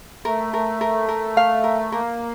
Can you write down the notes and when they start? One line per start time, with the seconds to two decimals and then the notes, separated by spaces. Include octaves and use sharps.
0.25 A3 A#4
0.54 A#4
0.81 A#4
1.08 A#4
1.37 F5
1.64 A#4
1.92 A#3 A#4